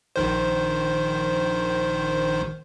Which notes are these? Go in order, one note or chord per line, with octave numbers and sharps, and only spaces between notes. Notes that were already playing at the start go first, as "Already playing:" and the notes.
A#1 D#3 C5